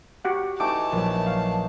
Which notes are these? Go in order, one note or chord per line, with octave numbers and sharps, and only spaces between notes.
F#4 G4 F#5
E3 A3 D#4 G5 A5 D6
A#1 F#3
F5